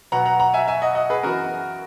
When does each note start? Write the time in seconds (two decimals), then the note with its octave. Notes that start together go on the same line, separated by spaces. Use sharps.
0.12 B2 F#3 B3 F#5 A#5
0.25 F#5 A#5
0.40 F#5 A#5
0.54 E5 G#5
0.68 E5 G#5
0.82 D#5 F#5
0.95 D#5 F#5
1.10 G#4 B4
1.23 F#2 E3 B3 F#4 A#4